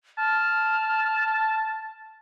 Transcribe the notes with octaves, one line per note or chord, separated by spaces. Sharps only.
A5 F6